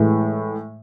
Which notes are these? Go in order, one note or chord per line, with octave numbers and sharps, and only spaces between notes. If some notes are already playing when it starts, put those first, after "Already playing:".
Already playing: A2 E3 G#3